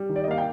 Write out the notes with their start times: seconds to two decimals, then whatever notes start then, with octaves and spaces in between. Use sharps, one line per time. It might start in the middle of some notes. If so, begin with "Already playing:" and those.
Already playing: G3
0.09 D#3
0.16 D5
0.24 D#5
0.28 A#3 F5
0.38 G5